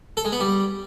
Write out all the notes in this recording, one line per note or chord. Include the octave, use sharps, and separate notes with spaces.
A4
G#3
B3
G3